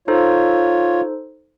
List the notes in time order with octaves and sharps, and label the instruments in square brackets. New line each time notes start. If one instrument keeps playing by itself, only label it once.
[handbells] D#4 A4 C5 [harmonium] F4 C#5